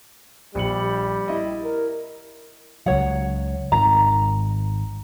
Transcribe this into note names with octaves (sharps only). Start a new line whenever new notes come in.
A#1 G3 C#7 F#7
E4 D#5
A#4
C#2 F#3 C#5 F#5
G#1 D#3 A#5